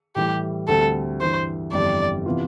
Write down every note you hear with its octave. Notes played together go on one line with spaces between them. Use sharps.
A2 E3 G3 G4
D2 D3 G3 C4 A4
G2 E3 G3 C5
G1 F2 E3 G3 D5
C3 E3 B3 F4